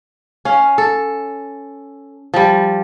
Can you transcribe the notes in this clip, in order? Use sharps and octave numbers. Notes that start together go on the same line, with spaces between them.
C#4 F5
A4
F3 G3